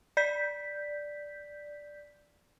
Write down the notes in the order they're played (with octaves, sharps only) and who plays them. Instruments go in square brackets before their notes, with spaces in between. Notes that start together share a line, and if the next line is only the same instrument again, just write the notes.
[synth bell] D5 G6 B6